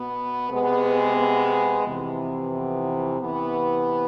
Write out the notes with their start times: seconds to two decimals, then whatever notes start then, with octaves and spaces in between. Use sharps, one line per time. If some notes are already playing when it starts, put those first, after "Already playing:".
Already playing: B2 B3
0.49 C3 G#3 B3
1.17 B3
1.84 F2 C3 E3 B3
2.52 B3
3.20 C3 E3 B3